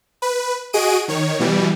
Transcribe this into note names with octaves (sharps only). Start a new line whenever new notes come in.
B4
F#4 G#4 D#5 D7 D#7
D#3 C#5
B2 E3 G3